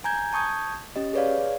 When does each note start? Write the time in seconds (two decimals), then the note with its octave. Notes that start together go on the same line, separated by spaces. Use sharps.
0.04 G#5 A#5 G6 G#6
0.33 A5 C#6 D#6 G6 G#6
0.96 C#4 G4 D#5
1.13 G#4 B4 C#5 D5 F5